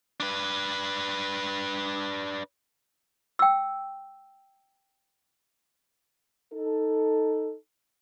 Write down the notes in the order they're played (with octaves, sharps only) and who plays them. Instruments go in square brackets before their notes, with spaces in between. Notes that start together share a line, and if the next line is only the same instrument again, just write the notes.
[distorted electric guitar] D4 B4
[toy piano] G5 E6
[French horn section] D#4 A4